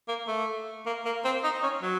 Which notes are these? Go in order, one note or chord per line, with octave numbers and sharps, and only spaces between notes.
A#3
A3
A#3
A#3
C4
D#4
C#4
F#3